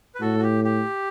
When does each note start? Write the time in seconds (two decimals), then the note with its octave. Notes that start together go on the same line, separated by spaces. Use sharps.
0.15 B4
0.21 A2 F#4 A4
0.39 F#4
0.43 G4
0.64 G4